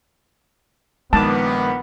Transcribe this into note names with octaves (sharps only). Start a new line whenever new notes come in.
A#1 D#3 G#3 B3 A5 D6